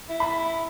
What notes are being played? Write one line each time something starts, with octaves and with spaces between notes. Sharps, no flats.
E4
B5